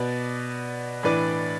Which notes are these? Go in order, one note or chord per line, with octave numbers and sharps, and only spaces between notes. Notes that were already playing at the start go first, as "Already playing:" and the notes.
Already playing: B2 B3 F#4 B4 D5
A2 E3 D4 B4 D5